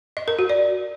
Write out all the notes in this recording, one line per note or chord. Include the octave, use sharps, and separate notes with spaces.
D#5
A#4
F#4
D5